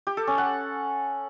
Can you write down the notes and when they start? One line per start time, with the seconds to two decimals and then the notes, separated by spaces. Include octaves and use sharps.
0.07 G4
0.17 A4
0.27 C#4
0.38 F#5